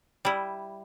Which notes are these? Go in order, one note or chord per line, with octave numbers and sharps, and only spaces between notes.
G3 E4